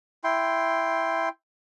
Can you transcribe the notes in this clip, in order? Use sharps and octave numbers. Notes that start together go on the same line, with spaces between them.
E4 G5 C6